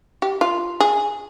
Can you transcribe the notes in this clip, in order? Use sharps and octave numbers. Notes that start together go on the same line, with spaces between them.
G4
F4
G#4